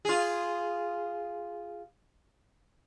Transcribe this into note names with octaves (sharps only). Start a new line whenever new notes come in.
F4 G#4